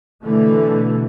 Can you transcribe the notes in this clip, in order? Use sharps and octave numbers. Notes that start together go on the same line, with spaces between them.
B2 D3 E3 A3